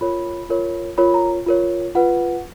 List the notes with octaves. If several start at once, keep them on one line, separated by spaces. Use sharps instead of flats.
F4 A#4 C#5 B5
F4 A#4 C#5
F4 A#4 C#5 B5
A#5
F4 A#4 C#5
F4 B4 F#5